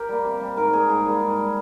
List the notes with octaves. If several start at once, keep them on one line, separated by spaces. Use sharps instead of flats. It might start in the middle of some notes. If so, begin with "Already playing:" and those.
Already playing: G4 A#4
G3 A#3
C3
G3 A#3
G#2 A#4
G3 A#3 G#4
G#2 G#4
G3 A#3
G#2
G3 A#3